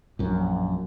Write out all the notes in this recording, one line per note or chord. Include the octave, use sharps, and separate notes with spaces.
A#1 F#2